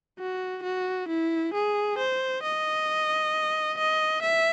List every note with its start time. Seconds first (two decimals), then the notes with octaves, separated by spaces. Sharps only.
0.19 F#4
0.63 F#4
1.08 E4
1.54 G#4
1.98 C5
2.43 D#5
3.78 D#5
4.22 E5